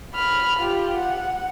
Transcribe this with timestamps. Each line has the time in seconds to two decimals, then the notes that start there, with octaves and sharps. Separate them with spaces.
0.14 B5 F6
0.59 F4 G4
0.97 F#5